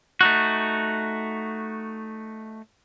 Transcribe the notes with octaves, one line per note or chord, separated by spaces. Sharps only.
A3 D#4 F#4